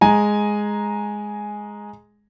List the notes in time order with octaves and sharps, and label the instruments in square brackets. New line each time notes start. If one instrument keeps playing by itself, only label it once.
[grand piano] G#3 G#5 A#5